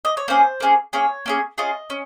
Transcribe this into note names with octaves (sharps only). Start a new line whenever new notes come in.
D#5
C#5
A#3 C#4 G#4 C5
A#3 C#4 G#4
A#3 C#4 G#4 C#5
A#3 C#4 G#4
C#4 F4 G#4 D#5
C#4